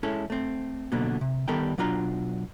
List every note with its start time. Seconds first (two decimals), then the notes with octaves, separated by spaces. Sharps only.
0.03 G#3 C#4 E4 A4
0.30 A3 C4
0.92 B2 D3 F#3 A#3 B3
1.21 C3
1.48 D#3 G3 B3 A4 A#4 G5
1.78 B1 F#3 D4 F4 A#5